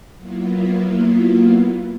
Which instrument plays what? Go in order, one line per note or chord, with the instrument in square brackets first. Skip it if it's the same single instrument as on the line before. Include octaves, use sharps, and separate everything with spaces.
[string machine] F#3 A#3 B3 E4 F4